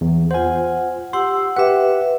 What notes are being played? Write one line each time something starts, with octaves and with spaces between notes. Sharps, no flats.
E2
F4 C5 F#5 G#5
G4 F#5 C6 E6
G4 B4 E5 F#5